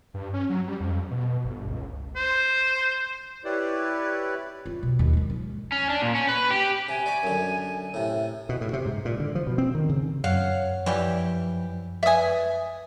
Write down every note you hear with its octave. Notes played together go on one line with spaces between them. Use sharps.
G2
C#4
F#3
G3
F2
B2
G1
C#2
C5
E4 G4 B4 C#5 D5
F4
B2
D#2
G#2 D#3
F3
C#4
D4
A#2
C#4
B4
G4
C3 G#5
D5 C#6 D6
F#2 D3
A2 C3
B2
A2
C3
G#2
A#2
D3
F3
B2
C4
D#3
C#3
F#2 C#5 F5 F#5
E3 F3 G3 G4
B4 D5 E5 G#5 D#6